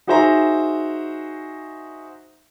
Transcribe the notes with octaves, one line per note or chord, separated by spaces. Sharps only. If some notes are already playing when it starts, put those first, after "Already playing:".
D#4 F#4 G#4 C5 E5 A#5